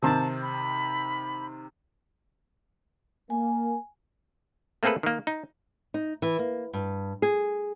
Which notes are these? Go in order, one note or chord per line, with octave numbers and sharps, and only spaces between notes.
C3 D#3 C4 A5
B5
A#3 G#5
A3 A#3 C4 G#4 A4 B4
D#3 A#3
D#4
D#4
E3
A#3
G2
G#4